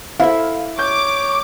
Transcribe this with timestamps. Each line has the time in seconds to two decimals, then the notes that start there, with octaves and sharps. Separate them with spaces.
0.20 E4 A4 C5 E5 F5
0.79 C#5 D6 G6